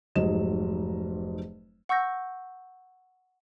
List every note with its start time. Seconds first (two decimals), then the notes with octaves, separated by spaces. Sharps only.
0.16 F1 G#2 F#3 D#5 E7
1.89 F#5 C#6 E6 G6 A#6